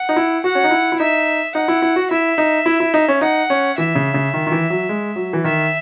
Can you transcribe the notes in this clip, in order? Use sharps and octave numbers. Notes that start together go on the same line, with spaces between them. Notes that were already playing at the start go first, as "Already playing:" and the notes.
Already playing: F#5
D#4
E4
F#4 F#5
C#4
D#4
E4
E4
D#4 E5
D#4 F#5
E4
E4
F#4
E4 E5
D#4
E4
E4
D#4
C#4
D#4 F#5
C#4
E3 E5
C#3
C#3
D#3
D#3
E3
F#3
G#3
F#3
E3
D#3 E5